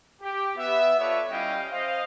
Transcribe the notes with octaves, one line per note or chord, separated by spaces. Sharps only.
G4
B3 E5
F4 A4 B4 C#5 D5 E5
G3 C#4 E4 D#5 F5 G5
C5 D#5 F5